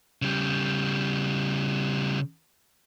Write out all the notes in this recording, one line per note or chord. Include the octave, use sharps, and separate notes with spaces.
C#3 G3